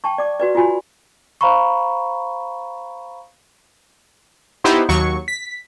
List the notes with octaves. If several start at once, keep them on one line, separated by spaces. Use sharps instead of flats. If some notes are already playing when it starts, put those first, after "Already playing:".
G5 A5 C#6
D5 D6
F#4 B4 D5
F4 F#4 G#5 B5
C5 F5 A#5 B5 C#6
B3 D#4 E4 G4 C5
D#2 F#3 C#6
B6